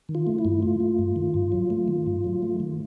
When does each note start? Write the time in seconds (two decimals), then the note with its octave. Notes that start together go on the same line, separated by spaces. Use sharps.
0.09 D#3
0.15 F4
0.27 A3
0.39 E4
0.45 G2
0.62 A3 F4
0.80 A3
0.99 G2
1.16 D#3
1.34 G2
1.52 F#3
1.70 A3
1.88 D#3
2.06 G2
2.24 F#3
2.42 A3
2.60 D#3